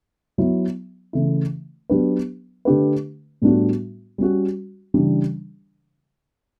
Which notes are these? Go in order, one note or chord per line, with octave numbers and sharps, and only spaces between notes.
F#3 B3 E4
C#3 E3 A3 E4
F#3 B3 D4 G4 B4
D3 A3 D4 G4 B4
A2 G3 B3 D4 F#4
G3 C#4 F#4
C#3 E3 G3 D4